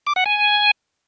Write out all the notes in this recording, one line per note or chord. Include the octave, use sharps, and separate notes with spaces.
D6
F#5
G#5